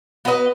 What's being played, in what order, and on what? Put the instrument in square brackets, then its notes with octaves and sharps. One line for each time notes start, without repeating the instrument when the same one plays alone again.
[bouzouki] B3 F#4 B4 D#5